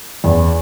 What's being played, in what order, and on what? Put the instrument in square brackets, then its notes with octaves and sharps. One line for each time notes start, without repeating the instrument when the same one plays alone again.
[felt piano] E2